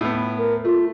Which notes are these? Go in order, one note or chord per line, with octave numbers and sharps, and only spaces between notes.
A2 B3
A#4
A3 F4